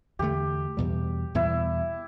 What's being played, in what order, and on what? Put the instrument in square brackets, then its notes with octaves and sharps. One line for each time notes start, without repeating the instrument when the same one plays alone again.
[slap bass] E2 D3 A3 [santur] G4
[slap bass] E2 B2 G3
[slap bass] E2 B2 G3 [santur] E4